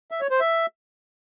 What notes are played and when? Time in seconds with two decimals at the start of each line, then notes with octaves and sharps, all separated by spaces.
0.11 E5
0.21 C#5
0.31 C5
0.40 E5